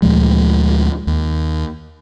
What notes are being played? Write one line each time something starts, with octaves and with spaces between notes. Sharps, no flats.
D2 A#2 F3 G#3
D#2